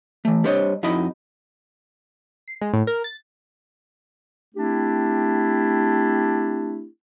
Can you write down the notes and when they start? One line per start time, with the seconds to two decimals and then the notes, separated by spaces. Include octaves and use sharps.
0.25 E3 A3
0.44 G3 D4 C5 C#5 D#5
0.83 F2 D#4 E4 F#4 D#5 B5
2.48 C7
2.61 G#3
2.73 A2
2.87 A#4
3.04 A6
4.55 A3 C4 D4 E4 G4